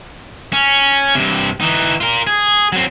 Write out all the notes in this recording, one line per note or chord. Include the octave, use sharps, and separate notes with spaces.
C#4
G2 C3
E3 D#4
F4 A#4
G#4
F#3 C4